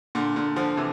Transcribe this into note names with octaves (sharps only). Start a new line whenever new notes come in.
A#2 D3
A#2 D3
D3 F3
C3 E3